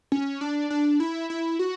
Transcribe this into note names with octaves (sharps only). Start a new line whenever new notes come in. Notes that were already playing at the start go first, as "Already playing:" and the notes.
C#4
D4
D4
E4
E4
F#4